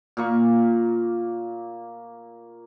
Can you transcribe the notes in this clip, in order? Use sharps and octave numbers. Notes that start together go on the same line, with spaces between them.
A#2 A#3 C#6